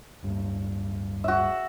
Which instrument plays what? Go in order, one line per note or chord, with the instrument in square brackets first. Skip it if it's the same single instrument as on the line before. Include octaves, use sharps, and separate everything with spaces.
[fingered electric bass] D1 G2
[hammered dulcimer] F#4 E5